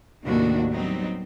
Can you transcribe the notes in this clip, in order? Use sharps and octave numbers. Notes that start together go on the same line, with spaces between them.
D#2 A2 C3 D#3 D4 F#4
F#3 G3 B3 C4 D#4